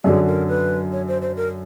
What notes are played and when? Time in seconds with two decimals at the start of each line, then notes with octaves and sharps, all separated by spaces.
0.04 F#2 D3 F#3 G#4
0.27 A#4
0.48 B4
0.92 C#5
1.08 C5
1.22 C5
1.37 A#4